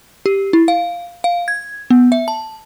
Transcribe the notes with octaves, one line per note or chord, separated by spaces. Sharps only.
G4
E4
F5
F5
G#6
B3
E5
A5